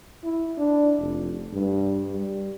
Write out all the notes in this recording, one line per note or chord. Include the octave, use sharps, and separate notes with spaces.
E4
D4
F1
G2
G3